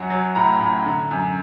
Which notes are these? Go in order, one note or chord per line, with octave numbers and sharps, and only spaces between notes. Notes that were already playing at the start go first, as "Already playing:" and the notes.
Already playing: F#2 F#3 F#5
F#3
A2 A#5
A2
D3
F#2